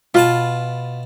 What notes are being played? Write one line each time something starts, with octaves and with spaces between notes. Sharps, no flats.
B2 F4 B4 A5